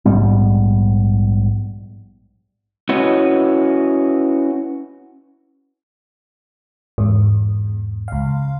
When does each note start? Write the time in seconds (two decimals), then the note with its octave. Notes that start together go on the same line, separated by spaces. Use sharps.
0.05 A#1 G#2 G3 B3
2.89 C#4 E4 F#4 B4 C#5 D#5
6.98 E2 G#2
8.08 C#2 F5